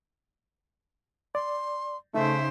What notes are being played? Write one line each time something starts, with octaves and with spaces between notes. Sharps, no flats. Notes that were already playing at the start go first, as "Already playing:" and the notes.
D5 C6
C#3 A3 D#4 C5 E5